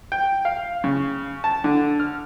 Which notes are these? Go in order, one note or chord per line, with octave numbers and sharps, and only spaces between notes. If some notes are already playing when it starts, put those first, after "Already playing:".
G5
F5
C#3
A5
D3
F6